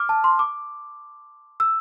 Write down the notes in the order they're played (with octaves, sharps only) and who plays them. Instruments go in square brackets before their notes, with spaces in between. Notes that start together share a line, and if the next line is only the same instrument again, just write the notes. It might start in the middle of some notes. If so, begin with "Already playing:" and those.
Already playing: [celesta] D6 F6
A5
C6
D6
E6